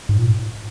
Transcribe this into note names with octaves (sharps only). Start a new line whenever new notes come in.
G#2
A#2